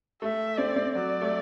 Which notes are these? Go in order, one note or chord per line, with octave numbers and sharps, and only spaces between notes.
A3 E5
C4 D5
C4
F#3 D5
A3